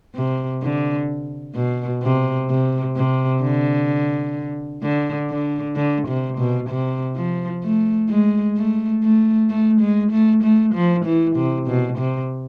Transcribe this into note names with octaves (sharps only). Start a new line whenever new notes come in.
C3
D3
B2
C3
C3
C3
D3
D3
D3
D3
C3
B2
C3
F3
A3
G#3
A3
A3
A3
G#3
A3
A3
F3
E3
C3
B2
C3